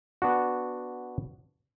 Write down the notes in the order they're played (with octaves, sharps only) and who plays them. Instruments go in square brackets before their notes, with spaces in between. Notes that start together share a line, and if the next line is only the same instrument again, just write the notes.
[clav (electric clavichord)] B3 D4 F#4